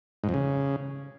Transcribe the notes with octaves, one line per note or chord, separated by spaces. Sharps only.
G#2
F2
C#3